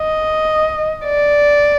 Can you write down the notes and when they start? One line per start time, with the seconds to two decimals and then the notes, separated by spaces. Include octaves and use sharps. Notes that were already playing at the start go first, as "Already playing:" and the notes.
Already playing: D#5
1.04 D5